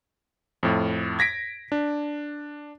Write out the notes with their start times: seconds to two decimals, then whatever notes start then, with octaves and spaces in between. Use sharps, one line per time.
0.63 F2 A2
1.19 G#6 A#6 B6 D7
1.72 D4